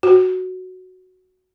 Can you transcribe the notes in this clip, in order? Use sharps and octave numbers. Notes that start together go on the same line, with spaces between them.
F#4